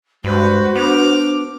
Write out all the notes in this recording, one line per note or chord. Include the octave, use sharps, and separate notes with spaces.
G2 G#3 F#4 B4 C5
B3 D4 D6 F6